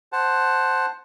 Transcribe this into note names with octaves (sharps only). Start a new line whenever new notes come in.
C5 F#5 A5